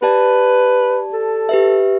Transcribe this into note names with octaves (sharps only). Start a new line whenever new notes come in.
G4 B4 D5 A5
A4
G4 B4 E5